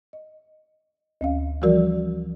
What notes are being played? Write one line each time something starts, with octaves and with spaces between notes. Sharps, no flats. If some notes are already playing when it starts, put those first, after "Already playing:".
D#5
D2 C#4 F5
E3 F3 G3 F#4 A#4 D5